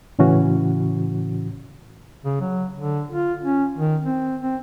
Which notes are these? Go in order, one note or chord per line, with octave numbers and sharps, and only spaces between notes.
A2 C#3 E3 C#4 F#4
C#3
F#3
D3
F4
C#4
D#3
C4
C4